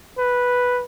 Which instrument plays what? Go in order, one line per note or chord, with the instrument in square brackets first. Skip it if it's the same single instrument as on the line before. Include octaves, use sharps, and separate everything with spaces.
[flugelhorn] B4